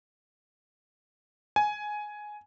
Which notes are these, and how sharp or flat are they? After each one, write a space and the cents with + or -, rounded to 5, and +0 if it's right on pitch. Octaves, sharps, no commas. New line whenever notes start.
G#5 +10